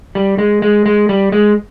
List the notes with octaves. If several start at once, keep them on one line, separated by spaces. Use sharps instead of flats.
G3
G#3
G#3
G#3
G3
G#3